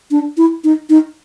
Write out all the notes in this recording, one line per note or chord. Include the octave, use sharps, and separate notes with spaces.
D4
E4
D#4
D#4